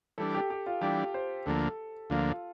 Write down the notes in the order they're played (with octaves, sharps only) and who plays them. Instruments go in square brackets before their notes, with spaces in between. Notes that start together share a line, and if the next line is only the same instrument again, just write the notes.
[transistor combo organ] E3 G3 D4 [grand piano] A4
[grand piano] G4
G4
F4
[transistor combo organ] E3 G3 D4 [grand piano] G4
[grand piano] C5
[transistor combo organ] D2 D3 F3 A#3 [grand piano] A4
[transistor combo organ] D2 D3 F3 A#3 [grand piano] F4